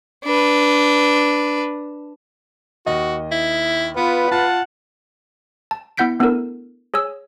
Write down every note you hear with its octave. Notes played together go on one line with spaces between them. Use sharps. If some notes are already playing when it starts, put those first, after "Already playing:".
D4 B4
D#2 F#4 D#5
E4
B3 F4 B4
F4 F#5 A5
A5
B3 E4 F#5 G6 B6 D7
A3 B3 D4 E4 A4 A#4
G#4 C#5 G#5 E6